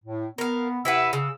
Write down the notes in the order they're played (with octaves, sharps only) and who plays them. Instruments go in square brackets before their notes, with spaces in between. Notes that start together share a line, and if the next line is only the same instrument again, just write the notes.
[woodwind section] A2
[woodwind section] B3 [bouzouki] A#4 F5
[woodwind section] C3 E5 E6 [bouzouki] E4 B4 F#5
[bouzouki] C#3 [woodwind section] E6